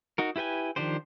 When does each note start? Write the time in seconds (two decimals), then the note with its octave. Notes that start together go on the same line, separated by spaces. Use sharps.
0.18 D#4 F#4 A#4
0.36 E4 G4 B4 G5 G#5
0.76 D#3 F3 D4 G4 C5